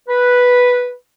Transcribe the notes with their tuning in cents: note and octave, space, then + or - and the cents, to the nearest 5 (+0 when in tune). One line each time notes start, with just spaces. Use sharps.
B4 -5